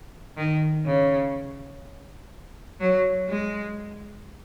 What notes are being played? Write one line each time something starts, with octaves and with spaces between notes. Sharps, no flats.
D#3
C#3
F#3
G#3